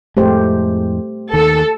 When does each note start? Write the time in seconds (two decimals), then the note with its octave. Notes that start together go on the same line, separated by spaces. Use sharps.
0.17 F2 A2 G#3 A3 G4 C5
1.33 D#2 D#3 A4